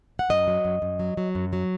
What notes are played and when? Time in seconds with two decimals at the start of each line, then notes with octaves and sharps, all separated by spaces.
0.19 F#5
0.30 F#2 D#5
0.47 F#3
0.65 F#2
0.82 F#2
1.00 F#3
1.17 F#3
1.35 F#2
1.53 F#3